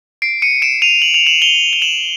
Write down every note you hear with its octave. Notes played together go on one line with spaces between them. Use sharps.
C7 D7
C#7 D#7
D7 E7
D#7 F7
F#7
F7
E7 F#7
F7 G7
G7
E7 F#7